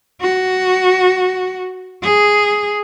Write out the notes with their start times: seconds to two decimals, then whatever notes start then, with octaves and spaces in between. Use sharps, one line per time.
0.21 F#4
2.03 G#4